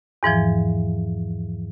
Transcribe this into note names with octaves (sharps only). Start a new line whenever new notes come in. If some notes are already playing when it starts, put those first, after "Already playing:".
E2 G#2 E3 F3